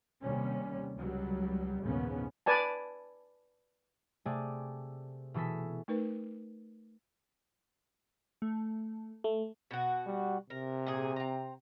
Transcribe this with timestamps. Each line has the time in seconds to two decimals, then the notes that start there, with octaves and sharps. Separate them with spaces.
0.20 D#2 C3 G3 C#4
0.96 C#2 F#3 G3
1.82 A#1 D#2 G#2 C#3 B3 C#4
2.46 B4 D5 G#5 A5
4.25 C3 A3 G#4 D5
5.34 B2 E3 G#4 A4 B6
5.88 A3 D#4 A#4 B4
8.42 A3
9.24 A3
9.71 B2 F#4
10.06 G3
10.50 C3 A#4
10.86 A#2 G#4
11.16 C4 A#5